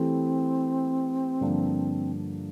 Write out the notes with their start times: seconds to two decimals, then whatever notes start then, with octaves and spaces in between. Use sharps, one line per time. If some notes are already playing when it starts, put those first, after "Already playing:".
Already playing: E3 A3 C4 E4 G4
1.41 G2 D3 F3 A#3 D4